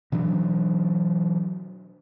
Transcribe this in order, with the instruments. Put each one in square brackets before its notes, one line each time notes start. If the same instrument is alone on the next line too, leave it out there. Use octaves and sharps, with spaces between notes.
[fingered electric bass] B2 E3 F#3 D4